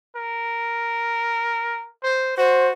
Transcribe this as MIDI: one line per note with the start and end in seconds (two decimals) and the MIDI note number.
0.15 1.89 70
2.04 2.35 72
2.37 2.72 66
2.37 2.68 72